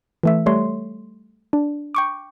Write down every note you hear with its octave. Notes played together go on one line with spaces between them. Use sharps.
E3 A3 E5
G3 A3 C#5 C6
D4
G5 C#6 D6